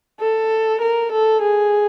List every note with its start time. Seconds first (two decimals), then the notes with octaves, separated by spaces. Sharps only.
0.20 A4
0.82 A#4
1.12 A4
1.42 G#4